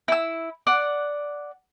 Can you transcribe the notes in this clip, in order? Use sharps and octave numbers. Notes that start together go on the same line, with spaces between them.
E4 E6
D5 F#5 F#6